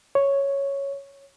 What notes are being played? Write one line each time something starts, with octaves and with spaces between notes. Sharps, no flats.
C#5